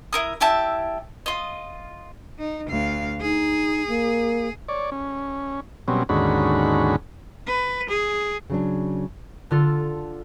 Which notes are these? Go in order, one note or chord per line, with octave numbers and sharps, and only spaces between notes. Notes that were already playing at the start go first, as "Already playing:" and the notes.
E4 A#4 D#6
E4 G4 E5 A5
F4 D#5
D#4
D2 F5
D#4 G#4
A#3
C#5 D5
C#4
B2 F#3 G3 C4 C#4
D#2 G#2 D3 C#4 F#4 B5
B4
G#4
C#3 F#3 D4
D3 F4 A4